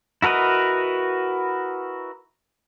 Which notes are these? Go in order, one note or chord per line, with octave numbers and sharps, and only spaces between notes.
E4 F#4 A#4 B4 D#5